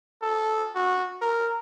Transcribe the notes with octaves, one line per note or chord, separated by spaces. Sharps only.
A4
F#4
A#4